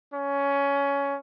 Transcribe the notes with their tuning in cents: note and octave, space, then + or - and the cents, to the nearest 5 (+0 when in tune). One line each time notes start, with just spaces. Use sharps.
C#4 +15